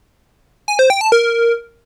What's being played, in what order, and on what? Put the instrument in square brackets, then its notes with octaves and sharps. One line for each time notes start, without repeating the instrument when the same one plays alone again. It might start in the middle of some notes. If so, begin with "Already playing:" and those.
[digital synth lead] G#5
C5
G5
A5
A#4